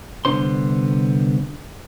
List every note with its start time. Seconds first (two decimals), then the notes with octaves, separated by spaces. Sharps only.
0.25 C2 D3 B3 D4 C5 C6